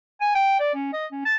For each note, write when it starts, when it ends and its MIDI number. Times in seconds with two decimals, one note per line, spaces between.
0.21 0.31 80
0.35 0.59 79
0.59 0.73 74
0.74 0.92 61
0.93 1.06 75
1.12 1.21 61
1.25 1.36 81